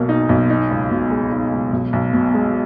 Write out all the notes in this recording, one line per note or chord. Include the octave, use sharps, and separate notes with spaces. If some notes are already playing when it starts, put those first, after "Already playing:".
Already playing: B1 B2 A#3
D#4
B1
D#4
C#2
B2
G#3
D#4
C#2
B1
B1
B2
G#3